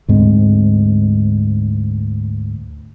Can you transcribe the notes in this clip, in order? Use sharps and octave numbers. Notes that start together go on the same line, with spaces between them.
D2 G#2 G#3 C4